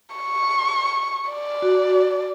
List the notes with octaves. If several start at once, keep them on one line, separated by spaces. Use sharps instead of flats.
C#6
D5
F#4